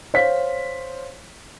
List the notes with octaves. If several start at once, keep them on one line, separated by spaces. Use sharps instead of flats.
C5 C#5 F5 B6